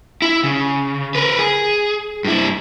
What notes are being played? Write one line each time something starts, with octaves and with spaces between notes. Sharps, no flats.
E4
C#3
A#4 B4
G#4
G2 E4